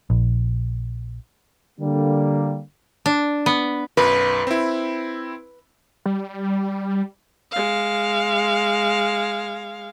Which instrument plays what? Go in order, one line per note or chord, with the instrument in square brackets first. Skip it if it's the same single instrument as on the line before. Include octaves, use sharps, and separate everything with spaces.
[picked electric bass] A#1
[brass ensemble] D3 G3 A#3
[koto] D4
B3
[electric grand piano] B1 F#2 [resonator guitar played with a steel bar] B4
[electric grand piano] C4 E4
[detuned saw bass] G3
[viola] G#3 F5